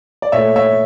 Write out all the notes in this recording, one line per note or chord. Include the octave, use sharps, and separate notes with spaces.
D5
A#2 A3 C#5 E5
C#5 E5